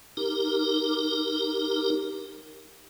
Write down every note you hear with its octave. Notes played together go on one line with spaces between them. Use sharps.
D#4 G4 A#4